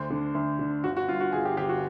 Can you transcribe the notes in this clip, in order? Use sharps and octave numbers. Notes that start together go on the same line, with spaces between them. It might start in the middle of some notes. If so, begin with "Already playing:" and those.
Already playing: D2 C5
D3
D2
D3
G1 F#4
F#4
G2 F4
F#4
G1 G#4
G4
G1 G4
F#4